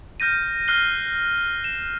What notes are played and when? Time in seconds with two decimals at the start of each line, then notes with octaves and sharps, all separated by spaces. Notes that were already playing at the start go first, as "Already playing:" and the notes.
0.20 F6 G6 A#6 D#7
0.68 F6 F#6 C7 G7
1.64 E7